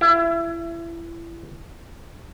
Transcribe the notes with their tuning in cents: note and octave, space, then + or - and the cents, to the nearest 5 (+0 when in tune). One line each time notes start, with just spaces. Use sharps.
E4 +30